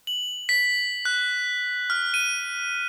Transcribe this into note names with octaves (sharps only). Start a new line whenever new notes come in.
F#7
B6
F#6
F6
D#7